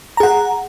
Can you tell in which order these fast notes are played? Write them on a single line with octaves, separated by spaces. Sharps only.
A#5 G#4 F#5